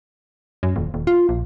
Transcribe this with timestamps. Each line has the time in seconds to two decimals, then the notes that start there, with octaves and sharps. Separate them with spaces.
0.63 F#2
0.76 D#1
0.94 D#1
1.07 F4
1.29 A#1